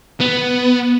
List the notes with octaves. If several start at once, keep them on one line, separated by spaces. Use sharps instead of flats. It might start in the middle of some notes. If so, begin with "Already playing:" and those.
B3